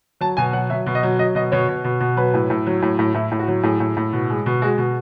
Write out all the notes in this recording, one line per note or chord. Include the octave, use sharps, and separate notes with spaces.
F#3 A5
B2 G#5
F#3 F#5
F#3 E5
B2
D#5
F#3
F#3 D#5
B2 D#5
B2 C#5
B2
B2
B2
F#3 B4
A2
A2
F#3
A2
A2
A2 E4
A2
F#4
F#3
A2 G#4
A2
A2
B2
G#3
B2
G#3 F#4
B2